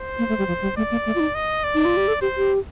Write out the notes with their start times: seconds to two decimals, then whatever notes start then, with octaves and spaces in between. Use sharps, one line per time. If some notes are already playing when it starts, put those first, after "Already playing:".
Already playing: C5
0.19 A#3
0.29 A3
0.38 G3
0.48 F3
0.62 G3
0.77 A3 D5
0.91 A#3
1.06 A3
1.15 F4
1.20 D#4
1.35 D#5
1.64 D5
1.75 D#4
1.85 F4
1.97 G4
2.08 A4
2.21 G4 C5
2.37 G4